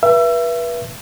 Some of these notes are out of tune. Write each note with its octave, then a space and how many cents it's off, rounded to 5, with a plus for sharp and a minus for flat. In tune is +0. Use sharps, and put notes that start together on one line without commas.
B4 -30 E5 +30